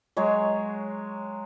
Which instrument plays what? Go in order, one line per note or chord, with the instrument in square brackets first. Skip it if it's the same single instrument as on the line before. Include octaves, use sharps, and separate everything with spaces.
[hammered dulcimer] F#3 G#3 C#5